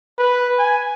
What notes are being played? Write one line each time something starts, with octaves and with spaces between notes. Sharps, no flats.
B4
G#5